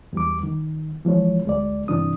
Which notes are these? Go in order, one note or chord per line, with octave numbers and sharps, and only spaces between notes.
E2 G3 D6
D#3
E3 F3 G#3 C#5
D2 G#3 D5
G2 C3 E3 D4 D#6